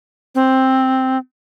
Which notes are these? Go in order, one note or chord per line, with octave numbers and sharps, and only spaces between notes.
C4